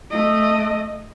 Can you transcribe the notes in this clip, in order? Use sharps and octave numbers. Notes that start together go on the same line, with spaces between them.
A3 D#5